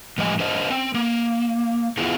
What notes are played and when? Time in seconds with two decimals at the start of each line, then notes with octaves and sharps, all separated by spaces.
0.18 A2 F3 G3 D#5 G5 G#5
0.39 D4 A#4 C5 D#5
0.70 C4
0.94 A#3
1.97 B3 E4 F4 G#4